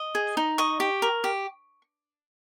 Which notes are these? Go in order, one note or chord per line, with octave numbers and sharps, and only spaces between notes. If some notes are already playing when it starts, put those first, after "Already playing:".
Already playing: D#5
G#4
D#4
D#5 C#6
G4
A#4
G4